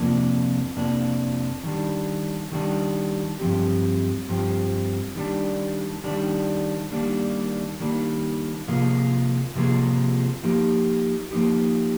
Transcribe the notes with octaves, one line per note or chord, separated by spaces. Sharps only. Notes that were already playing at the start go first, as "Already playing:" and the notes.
Already playing: F2 C3 F3 A#3 D4
F2 C3 F3 A#3 D4
D#3 G3 D4
D#3 G3 D4
G2 F3 C4 G4
G2 F3 C4 G4
D#3 G3 D4
D#3 G3 D4
D#3 G3 A#3 D4
D#3 G3 A#3 D4
C3 F3 A#3 F4 G#4
C3 F3 A#3 F4 G#4
F3 A#3 D#4 G4
F3 A#3 D#4 G4